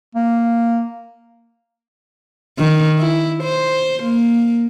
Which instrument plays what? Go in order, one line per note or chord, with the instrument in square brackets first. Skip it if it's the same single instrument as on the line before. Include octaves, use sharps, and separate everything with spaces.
[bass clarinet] A#3
[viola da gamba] D#3
E4
C5
A#3